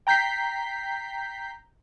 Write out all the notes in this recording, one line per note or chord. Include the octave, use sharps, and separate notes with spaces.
G5 A#5 G6 B6 C7